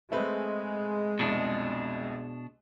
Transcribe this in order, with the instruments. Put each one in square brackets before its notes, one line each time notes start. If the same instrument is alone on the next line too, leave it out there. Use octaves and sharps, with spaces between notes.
[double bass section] G#3 [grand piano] A3 C4 B4
[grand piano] C2 F2 [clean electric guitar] B2 D4